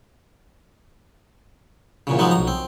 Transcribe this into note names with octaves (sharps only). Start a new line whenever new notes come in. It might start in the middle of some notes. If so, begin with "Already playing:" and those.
E2 A#2 C#3
G#2 F3 F#3 G#3 B3 D#4
B1 A#5
C4